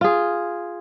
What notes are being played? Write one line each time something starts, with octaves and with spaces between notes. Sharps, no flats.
F4 G#4